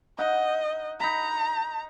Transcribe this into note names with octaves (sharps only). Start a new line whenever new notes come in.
D#4 D#5 F#5
D#4 A#5 B5